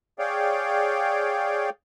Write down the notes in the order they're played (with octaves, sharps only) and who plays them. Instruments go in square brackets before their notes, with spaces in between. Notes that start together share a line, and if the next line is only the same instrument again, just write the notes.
[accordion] G#4 C#5 D5 F5 G5